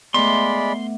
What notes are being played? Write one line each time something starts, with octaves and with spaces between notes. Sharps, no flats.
G#3 A3 B3 D5 B5 C6